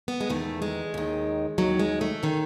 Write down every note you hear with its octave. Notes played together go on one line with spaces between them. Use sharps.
B3
G#3
E2 D#3 A3
G#3
D#2 D#3
D#2 D#3 F#3
G#3
A3
D#3 C#4